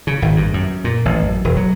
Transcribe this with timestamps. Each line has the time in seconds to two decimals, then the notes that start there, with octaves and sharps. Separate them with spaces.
0.07 C#3
0.22 G#1
0.36 G2
0.54 F#2
0.84 A#2
1.05 A1
1.22 F#2
1.44 E1
1.56 F#3